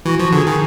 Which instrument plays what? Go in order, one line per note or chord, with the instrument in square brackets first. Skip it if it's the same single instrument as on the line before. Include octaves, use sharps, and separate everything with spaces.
[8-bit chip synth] E3 [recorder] F#4
[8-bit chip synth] F3
[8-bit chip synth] D3 [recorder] G#4
[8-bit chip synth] D#3